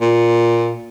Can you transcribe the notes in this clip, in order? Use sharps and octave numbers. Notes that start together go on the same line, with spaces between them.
A#2